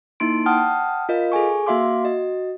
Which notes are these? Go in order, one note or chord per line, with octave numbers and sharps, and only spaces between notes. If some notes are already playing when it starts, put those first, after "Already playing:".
A#3 D#4 E4 C6 D7
F#5 G5 A5 D#6 F6
F4 A#4 D#5 F5
G#4 A4 G#5 C#6
A#3 F#4 E5 F5 C6 D6
F#4 D#5